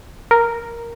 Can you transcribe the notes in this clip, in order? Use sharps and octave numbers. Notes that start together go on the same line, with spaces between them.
A#4